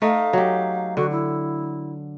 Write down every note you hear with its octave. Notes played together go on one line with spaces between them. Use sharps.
A3 D#4 D#5 F5
F#3 G4
D3 F#4
E4